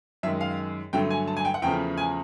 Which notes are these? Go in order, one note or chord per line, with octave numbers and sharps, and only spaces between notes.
F#2 D#3 G#3 E5
F5
G2 D3 F#3 A3 G5
G#5
A5
G#5
G5
F#5
E2 C#3 F3 A3 G5
G#5